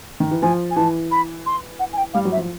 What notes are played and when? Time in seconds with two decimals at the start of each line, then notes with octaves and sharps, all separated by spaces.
0.20 D#3
0.31 E3
0.42 F3 G#5
0.71 G#5
0.76 E3 A5
1.11 B5
1.46 C6
1.79 F#5
1.93 G#5
1.97 G5
2.14 G3 F5
2.25 F#3
2.32 E5
2.37 F3